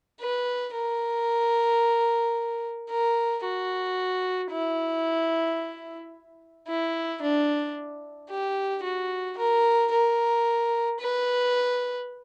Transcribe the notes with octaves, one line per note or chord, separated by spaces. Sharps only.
B4
A#4
A#4
F#4
E4
E4
D4
G4
F#4
A#4
A#4
B4